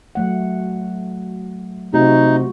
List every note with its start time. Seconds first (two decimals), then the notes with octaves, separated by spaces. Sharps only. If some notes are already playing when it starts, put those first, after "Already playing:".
0.15 F#3 A3 F#5
1.94 C3 A3 D#4 F4 F#4